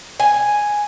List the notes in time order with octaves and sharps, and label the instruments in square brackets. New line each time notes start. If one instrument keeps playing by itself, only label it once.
[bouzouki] G#5